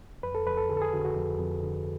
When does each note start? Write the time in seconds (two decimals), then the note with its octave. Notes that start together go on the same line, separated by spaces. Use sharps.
0.23 F2 B4
0.35 A4
0.47 F2 B4
0.57 A4
0.69 D3 G#4
0.77 A4
0.82 G#4
0.93 D3 F#4
1.05 F#4
1.16 F2
1.40 F2
1.63 D3